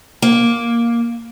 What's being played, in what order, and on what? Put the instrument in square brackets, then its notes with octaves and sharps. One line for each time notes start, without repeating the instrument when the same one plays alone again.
[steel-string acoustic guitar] A#3